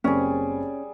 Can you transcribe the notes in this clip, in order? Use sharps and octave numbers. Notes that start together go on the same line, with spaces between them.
F#1 G3 C4 C#4 G#4